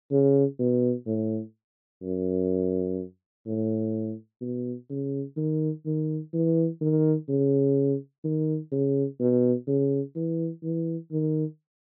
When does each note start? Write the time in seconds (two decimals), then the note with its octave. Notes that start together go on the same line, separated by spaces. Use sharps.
0.11 C#3
0.59 B2
1.07 A2
2.03 F#2
3.46 A2
4.41 B2
4.90 C#3
5.37 D#3
5.86 D#3
6.33 E3
6.81 D#3
7.29 C#3
8.24 D#3
8.72 C#3
9.20 B2
9.67 C#3
10.16 E3
10.63 E3
11.11 D#3